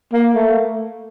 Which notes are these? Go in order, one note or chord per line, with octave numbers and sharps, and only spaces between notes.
A#3
A3